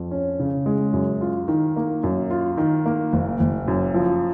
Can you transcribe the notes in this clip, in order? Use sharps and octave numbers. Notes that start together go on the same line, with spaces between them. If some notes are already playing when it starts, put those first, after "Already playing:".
Already playing: F2
C#4
C#3
G#3
F#2
F4
D#3
A#3
F#2
F4
D#3
A#3
F#1
F#1
F#2
F3